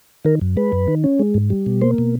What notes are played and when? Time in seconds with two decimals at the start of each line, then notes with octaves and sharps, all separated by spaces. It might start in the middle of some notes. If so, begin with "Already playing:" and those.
0.25 D#3 A#4
0.41 F#2
0.57 G#3 B4
0.72 F#2
0.88 D#3
1.04 C#4
1.19 G#3
1.34 G#2
1.50 G3
1.66 B2
1.81 A#3 C5
1.98 B2